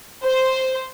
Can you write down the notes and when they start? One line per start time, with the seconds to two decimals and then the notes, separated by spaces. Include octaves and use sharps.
0.24 C5